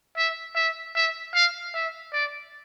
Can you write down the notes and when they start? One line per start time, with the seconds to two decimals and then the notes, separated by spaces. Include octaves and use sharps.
0.17 E5
0.56 E5
0.95 E5
1.34 F5
1.74 E5
2.13 D5